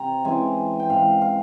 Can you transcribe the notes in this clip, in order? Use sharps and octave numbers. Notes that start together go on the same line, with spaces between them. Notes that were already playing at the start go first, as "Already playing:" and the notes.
Already playing: C3 A#5
C#3 E3 G#3 C4 G#5
G5
G#2 E3 G#3 F5
F5